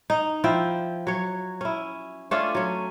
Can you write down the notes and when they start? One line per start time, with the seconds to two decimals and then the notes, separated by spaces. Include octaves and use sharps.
0.10 D#4
0.44 F3 E4 G5
1.07 F#3 C#5
1.61 C#4 E4
2.31 A3 C#4 D4 F4
2.55 F#3 C#4